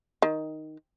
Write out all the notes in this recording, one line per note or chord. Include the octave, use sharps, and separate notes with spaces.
D#3